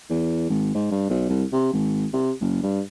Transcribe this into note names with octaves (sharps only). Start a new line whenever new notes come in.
E2
G#1
G#2
G2
B1
C2
C3
G#1
C3
F#1
G2